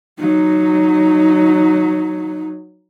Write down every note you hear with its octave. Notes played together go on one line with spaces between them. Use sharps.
F#3 D#4